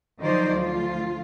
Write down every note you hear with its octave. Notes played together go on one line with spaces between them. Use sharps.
D#3 F3 F#3 D#4 C5 D5
D2 F3 F4